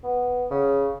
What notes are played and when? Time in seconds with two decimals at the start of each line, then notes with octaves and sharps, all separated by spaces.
0.04 B3
0.51 C#3